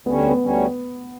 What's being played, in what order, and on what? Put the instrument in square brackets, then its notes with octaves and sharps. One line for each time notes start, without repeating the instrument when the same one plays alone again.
[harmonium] D2 D3 G3 C#4 [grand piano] B3
[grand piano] B3
[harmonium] D2 D3 G3 C#4